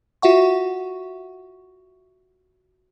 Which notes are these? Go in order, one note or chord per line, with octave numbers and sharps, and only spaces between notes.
F4 F#4 E5 F#5 C#6